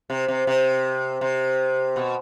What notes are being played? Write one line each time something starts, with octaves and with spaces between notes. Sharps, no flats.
C3
C3
C3
C3
B2